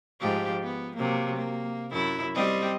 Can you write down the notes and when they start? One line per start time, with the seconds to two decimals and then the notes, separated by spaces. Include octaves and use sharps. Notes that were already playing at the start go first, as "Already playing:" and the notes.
0.21 G#2 F3 G4
0.63 B3
0.96 C3 F#3 A#3
1.36 A#3
1.91 F#2 E4
2.35 G3 C4 D#5